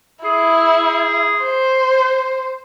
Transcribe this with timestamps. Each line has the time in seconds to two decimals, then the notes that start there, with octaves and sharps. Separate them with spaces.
0.24 E4 G#4
1.43 C5